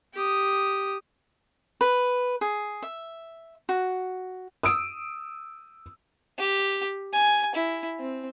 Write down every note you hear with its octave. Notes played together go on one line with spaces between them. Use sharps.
G4 D#6
B4
G#4
E5
F#4
D#6 E6 D7
G4
G#5
E4
C4